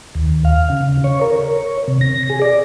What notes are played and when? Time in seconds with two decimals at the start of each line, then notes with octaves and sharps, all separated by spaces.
0.15 D#2
0.45 F5
0.70 C#3
1.04 C#5
1.21 A#4
1.44 C#5
1.88 C3
2.01 A#6
2.30 G#4
2.42 D5